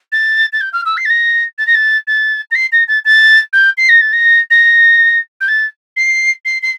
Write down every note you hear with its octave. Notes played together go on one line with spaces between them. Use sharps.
A6
A6
G6
F6
E6
C7
A6
A#6
A6
A#6
A6
A6
A#6
C7
A#6
A6
A6
G6
C7
A#6
A6
A#6
A#6
G6
A6
C7
C7
C7